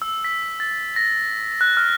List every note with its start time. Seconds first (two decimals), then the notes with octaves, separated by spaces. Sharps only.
0.02 E6
0.24 B6
0.60 A6
0.96 A#6
1.61 F#6
1.77 F6